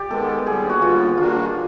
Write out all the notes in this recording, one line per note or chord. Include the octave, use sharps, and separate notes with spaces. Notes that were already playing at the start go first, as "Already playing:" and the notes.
Already playing: G4 D5
D#3 G#3 B3 A4
D#2 D3 G3 B3 G#4
F#4
D#2 D3 G3 B3 F4
D#3 G3 A#3 D4 F4 F#4